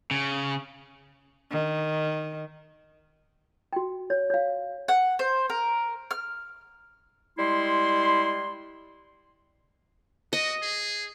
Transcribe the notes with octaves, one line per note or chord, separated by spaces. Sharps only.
C#3
D#3
F#4 G5
C#5
C#5 F5
F#5
C5
A#4
F6
G3 G#3 E4 C6
F#4 D#5
G#4